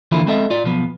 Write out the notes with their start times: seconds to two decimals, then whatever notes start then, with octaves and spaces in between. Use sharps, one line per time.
0.12 D3 E3 F3 A#3 E4 F4
0.27 G#3 C4 A4 D#5 E5
0.51 F4 D5
0.64 B1 F3 B3